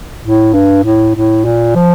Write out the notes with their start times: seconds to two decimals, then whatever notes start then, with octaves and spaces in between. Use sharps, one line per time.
0.23 A2
0.53 G2
0.84 A2
1.15 A2
1.45 A#2
1.75 F3